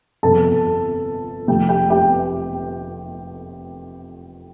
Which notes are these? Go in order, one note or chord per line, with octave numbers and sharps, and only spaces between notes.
G1 F2 C3 A4 A5
F1 F2 F3 A3 G4 G5
G4 G5
G4 G5